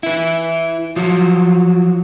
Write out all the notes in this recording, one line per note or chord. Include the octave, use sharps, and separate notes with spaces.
E4 B4
F3 F#3